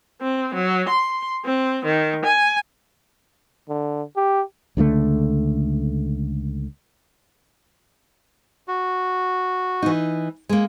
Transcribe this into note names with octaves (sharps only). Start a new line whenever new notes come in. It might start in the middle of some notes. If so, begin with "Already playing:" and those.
C4
F#3
C6
C4
D#3
G#5
D3
G4
C#2 D3 E3 A3
F#4
E3 D#4
G#3 A#3